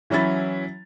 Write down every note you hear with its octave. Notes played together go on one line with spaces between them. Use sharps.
E3 F#3 C#4 E4 A6